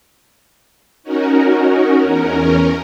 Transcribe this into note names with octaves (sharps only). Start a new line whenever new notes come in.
C#4 D#4 F#4 A#4
E2 C#4 A#4